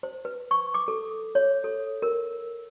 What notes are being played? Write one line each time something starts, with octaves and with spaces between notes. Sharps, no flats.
C5
B4
C#6
D6
A4
C#5
A4
A#4